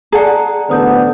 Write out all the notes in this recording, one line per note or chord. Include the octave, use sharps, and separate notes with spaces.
G#4 D5 F#5 A5 A#5
A1 D3 B3 C5 D#6 G6